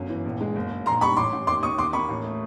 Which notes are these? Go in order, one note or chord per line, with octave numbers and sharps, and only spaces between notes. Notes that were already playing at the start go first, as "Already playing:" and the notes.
Already playing: G1 F#2
E3
A#1
G#3
F#1
F#1
A#1 A#5 C6
G3 B5 C#6
A1 C6 D6
A1
D#2 C6 D6
D#2 C#6 D#6
D#2 C6 D6
A#3 B5 C#6
A1
A3